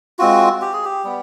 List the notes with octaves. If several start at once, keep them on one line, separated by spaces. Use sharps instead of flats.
G#3 C4 F4 F#4
G4
G#4
G4
G3 B3